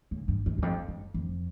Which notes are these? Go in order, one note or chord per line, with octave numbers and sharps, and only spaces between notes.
C#3
G2
F#2
E2
F2
F#2
F2